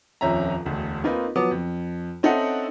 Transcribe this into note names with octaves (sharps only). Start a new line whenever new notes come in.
D#1 F2 C#4 E5 A#5
E1 D2
A#3 C4 D#4 F4 B4
F3 F#3 B3 D6 D#6
F2
C4 C#4 D#4 A4 E5 F#5